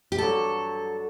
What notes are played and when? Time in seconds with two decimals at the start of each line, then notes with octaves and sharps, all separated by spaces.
0.12 G4
0.18 G2 D3 F#3 A4